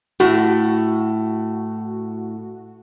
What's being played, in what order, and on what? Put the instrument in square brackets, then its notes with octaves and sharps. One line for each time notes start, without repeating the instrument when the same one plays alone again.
[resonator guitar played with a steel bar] A2 [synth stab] F#4